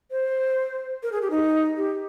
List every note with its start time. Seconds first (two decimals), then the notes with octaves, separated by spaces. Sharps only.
0.11 C5
1.03 A#4
1.12 G#4
1.22 G4
1.31 D#4
1.77 G4